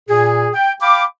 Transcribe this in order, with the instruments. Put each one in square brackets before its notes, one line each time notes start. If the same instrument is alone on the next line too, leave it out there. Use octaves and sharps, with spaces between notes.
[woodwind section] A#2 G#4
G5
F5 G5 B5 D6